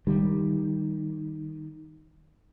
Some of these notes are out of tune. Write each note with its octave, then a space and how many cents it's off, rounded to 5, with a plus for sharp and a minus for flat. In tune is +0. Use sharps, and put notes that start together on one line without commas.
D#3 +0 G3 +0